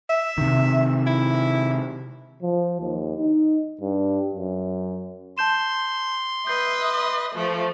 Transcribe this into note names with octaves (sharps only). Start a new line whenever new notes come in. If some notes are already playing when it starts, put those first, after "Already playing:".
E5
C3 D#3
E4
F3
D#2
D#4
G2
F#2
A5 C6 G6 E7
B4 D#5 E5 G6 C7
F3 A3